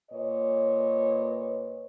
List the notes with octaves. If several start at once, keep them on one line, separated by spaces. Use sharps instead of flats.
A#2 B4 C#5 D#5